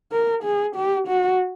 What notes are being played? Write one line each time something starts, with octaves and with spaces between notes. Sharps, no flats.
A#4
G#4
G4
F#4